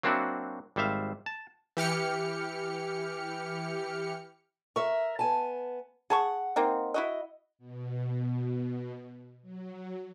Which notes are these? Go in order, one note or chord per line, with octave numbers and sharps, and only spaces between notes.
F#3 A#3 C4 D4 E4 F#4
G#1 G3 C5 E5 F5
A5
E3 G4 F6 C#7
A#4 E5 C#6
B3 G#5 A5
G#4 F#5 A5 C#6
A#3 C4 D#4
E4 F#4 D#5
B2
F#3